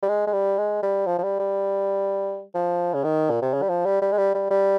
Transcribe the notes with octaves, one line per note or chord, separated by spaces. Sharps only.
G3
G#3
G#3
G3
G#3
G3
F3
F3
G3
G3
F3
C#3
D#3
A#2
C3
C#3
G3
F3
G3
G3
G#3
G3
G3
G3